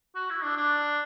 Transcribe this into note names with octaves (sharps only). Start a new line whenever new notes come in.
F#4
E4
D4
D4